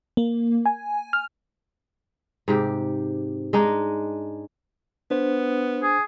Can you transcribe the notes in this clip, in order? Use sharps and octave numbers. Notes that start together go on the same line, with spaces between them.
A#3
G#5
F6
G#2 C3 G4
G#3 D4 D#4 G#4
B3 D4 C5
G#4